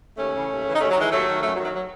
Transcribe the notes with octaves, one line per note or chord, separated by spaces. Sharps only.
D#2 A3 C#4
C#3 E3
D#2
C#3 E3
D#4
D#2 A3 C#4
F#3
D#3
E3 G#3
D#2 F#3 A3
D#3
F#2 F#3 A3
F#3
D#3
F#3
F#3